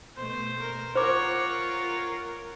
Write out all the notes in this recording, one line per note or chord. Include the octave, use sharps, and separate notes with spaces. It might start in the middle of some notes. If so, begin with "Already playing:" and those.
B2 A3 C5
A#4
F4 A#4 C5 C#5 F#5 D6